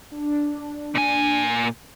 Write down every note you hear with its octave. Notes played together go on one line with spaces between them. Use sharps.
D4
A#2 G#5